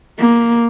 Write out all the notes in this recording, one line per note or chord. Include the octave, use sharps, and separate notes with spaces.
A#3